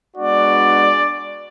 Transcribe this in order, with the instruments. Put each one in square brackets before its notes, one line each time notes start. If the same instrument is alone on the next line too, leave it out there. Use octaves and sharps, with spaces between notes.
[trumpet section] G#3 B3 D4 F#4 D5